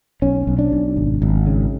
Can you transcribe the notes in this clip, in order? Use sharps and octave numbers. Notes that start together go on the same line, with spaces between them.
B1 C#4
B1
D4
B1
G#1
G#1
C#3